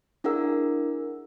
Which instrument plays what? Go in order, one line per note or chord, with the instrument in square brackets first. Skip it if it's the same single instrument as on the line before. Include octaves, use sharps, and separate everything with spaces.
[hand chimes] D4 E4 G#4 A#4 F#5 E6